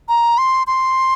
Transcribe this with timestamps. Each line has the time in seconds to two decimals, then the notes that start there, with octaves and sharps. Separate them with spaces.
0.09 A#5
0.38 C6
0.67 C6